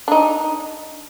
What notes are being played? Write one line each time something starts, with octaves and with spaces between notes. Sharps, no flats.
D4 D#4